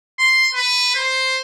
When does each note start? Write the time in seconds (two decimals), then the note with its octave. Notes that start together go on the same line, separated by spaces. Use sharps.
0.19 C6
0.54 B4
0.95 C5